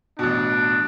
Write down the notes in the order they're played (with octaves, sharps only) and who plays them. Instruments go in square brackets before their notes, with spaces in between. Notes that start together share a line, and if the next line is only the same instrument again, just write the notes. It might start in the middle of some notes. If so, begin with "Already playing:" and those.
[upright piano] A1 B2 [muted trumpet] D4